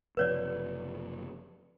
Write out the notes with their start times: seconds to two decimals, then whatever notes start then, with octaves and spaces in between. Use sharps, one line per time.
0.17 F#1 C3 F3 B4 C#5 D5